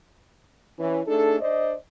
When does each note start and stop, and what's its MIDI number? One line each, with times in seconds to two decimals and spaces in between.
0.79 1.01 52
0.79 1.01 61
1.07 1.39 57
1.07 1.39 62
1.07 1.39 63
1.07 1.39 68
1.07 1.39 69
1.41 1.74 62
1.41 1.74 72
1.41 1.74 74
1.41 1.74 75